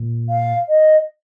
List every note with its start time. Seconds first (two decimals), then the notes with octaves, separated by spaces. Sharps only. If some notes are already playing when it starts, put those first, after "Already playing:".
Already playing: A#2
0.30 F5
0.69 D#5